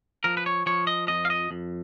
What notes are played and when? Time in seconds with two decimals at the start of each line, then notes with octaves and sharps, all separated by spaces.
0.24 F3 A#4
0.37 B4
0.46 C#5
0.66 F3 C#5
0.87 D#5
1.08 F2 D#5
1.25 F5
1.30 D#5
1.51 F2